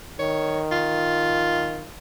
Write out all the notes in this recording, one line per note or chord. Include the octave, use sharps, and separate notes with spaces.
D#3 C#5
F4